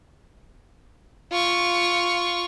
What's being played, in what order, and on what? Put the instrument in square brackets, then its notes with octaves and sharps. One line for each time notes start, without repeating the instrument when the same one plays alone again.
[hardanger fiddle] F4 C#6